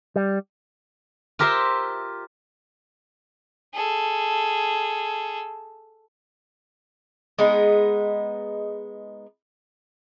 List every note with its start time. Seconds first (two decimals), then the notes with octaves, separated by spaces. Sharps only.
0.16 G3
1.39 F4 G4 A#4 C5 E5
3.74 G#4 A4
7.38 G#3 B3 D#4